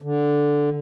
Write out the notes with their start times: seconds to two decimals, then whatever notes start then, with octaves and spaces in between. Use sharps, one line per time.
0.02 D3